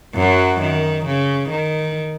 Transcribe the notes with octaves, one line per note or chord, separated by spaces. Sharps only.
F#2 F#3
D#3
C#3
D#3